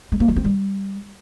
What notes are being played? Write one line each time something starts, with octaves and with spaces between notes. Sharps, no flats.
G#3
A#3
F#3
C4
G3